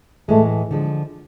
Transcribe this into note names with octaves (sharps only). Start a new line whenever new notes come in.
A2 E3 G#3 A3
D3 F3 G#3